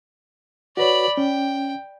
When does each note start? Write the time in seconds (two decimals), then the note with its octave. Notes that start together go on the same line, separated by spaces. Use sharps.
0.77 F#4 B4 C#5 D5 B5
1.17 C#4 G5